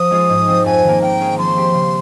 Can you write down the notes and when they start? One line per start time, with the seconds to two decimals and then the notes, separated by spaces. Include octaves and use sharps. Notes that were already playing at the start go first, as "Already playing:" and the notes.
Already playing: F3 D#6
0.11 G#3 C#4 F4 G#4
0.29 G#2
0.47 F3 C4
0.66 F2 G#5
0.83 D#3
0.88 A#3
1.02 A#3 G5
1.20 C#4 G#4
1.38 F3 C6
1.55 C4 G4
1.74 C#3